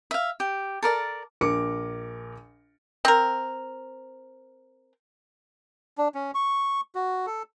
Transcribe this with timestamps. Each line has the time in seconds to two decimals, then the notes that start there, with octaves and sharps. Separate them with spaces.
0.11 E5 F5
0.40 G4
0.83 A4 A#4 D5 A5
1.41 A#1 A#4 D6 C#7
3.05 C4 A#4
5.98 D4
6.15 C#4
6.35 C#6
6.95 F#4
7.26 A4